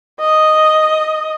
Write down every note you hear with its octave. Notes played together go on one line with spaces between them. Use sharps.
D#5